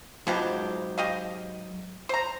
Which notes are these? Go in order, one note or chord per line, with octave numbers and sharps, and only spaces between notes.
G#2 B2 F3 F#3 G#3 G4
G4 D#5 F5
C5 A#5